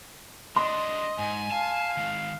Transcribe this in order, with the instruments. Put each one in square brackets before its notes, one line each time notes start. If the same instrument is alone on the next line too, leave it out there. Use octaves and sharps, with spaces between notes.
[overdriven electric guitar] G#3 D4 [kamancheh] D#5 [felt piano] C6
[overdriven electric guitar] G#2 [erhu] G#5
[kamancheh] F5 [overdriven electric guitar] A5
[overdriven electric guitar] D#3 G#3